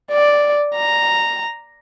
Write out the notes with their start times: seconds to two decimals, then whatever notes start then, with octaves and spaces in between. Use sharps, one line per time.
0.12 D5
0.76 A#5